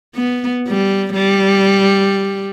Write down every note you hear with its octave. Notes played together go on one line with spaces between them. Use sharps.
B3
G3
G3